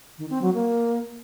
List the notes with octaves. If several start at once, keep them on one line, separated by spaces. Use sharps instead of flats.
D#3
C4
F#3
A#3